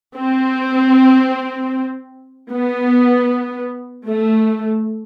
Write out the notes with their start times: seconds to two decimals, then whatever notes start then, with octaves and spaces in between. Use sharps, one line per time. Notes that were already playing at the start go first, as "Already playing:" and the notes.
0.17 C4
2.51 B3
4.07 A3